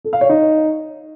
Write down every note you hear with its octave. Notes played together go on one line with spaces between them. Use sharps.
A4
F5
C#5
D#4